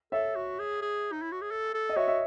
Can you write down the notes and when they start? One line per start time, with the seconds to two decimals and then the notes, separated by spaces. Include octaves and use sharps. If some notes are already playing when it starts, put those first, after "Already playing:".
0.12 A4 C#5 E5
0.36 F#4
0.59 G#4
0.81 G#4
1.12 D#4
1.22 E4
1.32 F#4
1.41 G#4
1.51 A4
1.74 A4
1.89 D#5
1.96 F#4 C#5 E5
2.08 E5